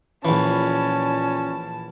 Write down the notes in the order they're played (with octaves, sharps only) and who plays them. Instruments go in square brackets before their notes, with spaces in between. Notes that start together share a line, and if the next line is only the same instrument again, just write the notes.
[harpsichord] A#1 E3 [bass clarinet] A#2 [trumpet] C#4 [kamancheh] A5